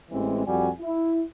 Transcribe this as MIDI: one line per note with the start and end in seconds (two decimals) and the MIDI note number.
0.11 0.44 33
0.11 0.44 52
0.11 0.44 56
0.11 0.44 60
0.47 0.69 41
0.47 0.69 55
0.47 0.69 66
0.47 0.69 80
0.80 1.21 64